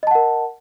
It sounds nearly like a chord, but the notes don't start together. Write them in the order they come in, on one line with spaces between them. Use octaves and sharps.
D#5 A5 F#5 A#4